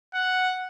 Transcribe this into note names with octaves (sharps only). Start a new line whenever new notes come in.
F#5